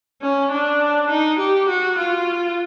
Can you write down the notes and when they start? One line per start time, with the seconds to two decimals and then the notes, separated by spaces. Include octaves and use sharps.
0.22 C#4
0.52 D4
1.10 D#4
1.39 G4
1.69 F#4
1.99 F4